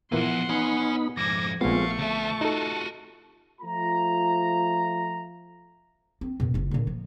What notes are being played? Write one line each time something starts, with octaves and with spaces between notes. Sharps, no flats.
A#2 E3 F3 A#3 B3 F#5 C6
B3 D#4 C#5 G#5 B5
F2 G#2 D6 G#6 A#6
A#1 G#3 A3 B3 C4 F4 F5 C#6
D2 E5 A5
D#4 F4 F#4 A4
F3 A3 F4 A#5
C4
F#2 B2
F#1 F4
A#2 D3
F3